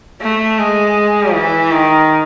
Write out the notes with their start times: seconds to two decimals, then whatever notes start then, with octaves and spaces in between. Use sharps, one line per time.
0.22 A3
0.59 G#3
1.34 E3
1.71 D#3